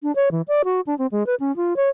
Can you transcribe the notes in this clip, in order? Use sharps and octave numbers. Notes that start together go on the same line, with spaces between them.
D4
C#5
E3
D5
F#4
D4
C4
G#3
B4
C#4
F4
C#5